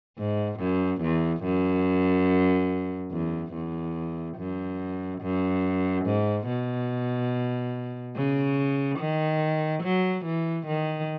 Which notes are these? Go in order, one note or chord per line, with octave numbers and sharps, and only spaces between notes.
G#2
F#2
E2
F#2
E2
E2
F#2
F#2
G#2
B2
C#3
D#3
F#3
E3
D#3